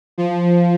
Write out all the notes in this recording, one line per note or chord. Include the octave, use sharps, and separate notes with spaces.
F3